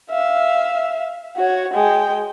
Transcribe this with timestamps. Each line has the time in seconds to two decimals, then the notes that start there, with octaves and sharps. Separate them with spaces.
0.10 E5 F5
1.37 F#4 C#5
1.74 G#3 G5